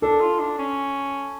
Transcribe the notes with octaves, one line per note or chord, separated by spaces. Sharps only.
D4 A4
F4
D4
C#4